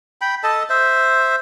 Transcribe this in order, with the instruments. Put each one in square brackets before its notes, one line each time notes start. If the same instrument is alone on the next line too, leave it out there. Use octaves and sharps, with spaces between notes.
[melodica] G5 B5
A4 D#5 A5
C5 E5